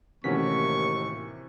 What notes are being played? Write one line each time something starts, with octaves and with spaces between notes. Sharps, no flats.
D#2 A2 C3 E3 C#4 F#4 C#6 B6